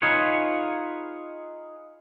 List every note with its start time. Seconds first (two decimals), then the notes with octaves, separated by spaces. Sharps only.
0.02 D#4 F4 G#4 B4 C#5